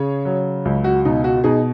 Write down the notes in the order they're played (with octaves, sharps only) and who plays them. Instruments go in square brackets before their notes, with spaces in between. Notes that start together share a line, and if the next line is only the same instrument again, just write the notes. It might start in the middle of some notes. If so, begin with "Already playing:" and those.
Already playing: [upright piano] C#3 G#4 C#5
F#3
C#2
F#4
B2 D#4
F#4
B2 D#4 G#4